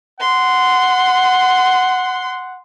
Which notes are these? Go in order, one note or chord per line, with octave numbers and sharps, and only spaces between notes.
F#5 C6